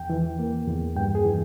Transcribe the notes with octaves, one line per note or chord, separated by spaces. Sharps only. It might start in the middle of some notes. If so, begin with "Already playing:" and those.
Already playing: E2 G5
E3
A#3
E2
G2 G5
G#4
E3